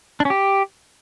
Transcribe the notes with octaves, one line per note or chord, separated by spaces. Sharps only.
D4
C#4
G4